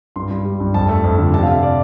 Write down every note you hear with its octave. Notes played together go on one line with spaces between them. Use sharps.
G2 C6
G2
G3
G2
F2 A5
A3
F2
D3
C3 A5
F5
C3 E5
D5